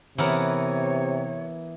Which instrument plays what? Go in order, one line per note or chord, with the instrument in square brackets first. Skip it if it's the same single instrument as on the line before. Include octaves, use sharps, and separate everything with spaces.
[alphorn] C3 [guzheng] E3 B3 A#4 [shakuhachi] C#5